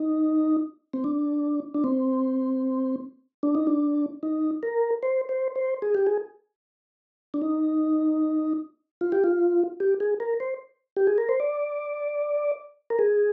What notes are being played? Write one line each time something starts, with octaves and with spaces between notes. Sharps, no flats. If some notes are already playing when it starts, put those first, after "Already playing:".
Already playing: D#4
C4
D4
D4
C4
D4
D#4
D4
D#4
A#4
C5
C5
C5
G#4
G4
G#4
D4
D#4
F4
G4
F4
G4
G#4
A#4
C5
G4
G#4
A#4
C5
D5
A#4
G#4